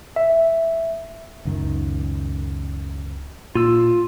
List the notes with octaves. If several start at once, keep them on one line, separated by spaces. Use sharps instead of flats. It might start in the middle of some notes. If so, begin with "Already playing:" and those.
E5
C#2 F#2 D#3
A#2 F4 E6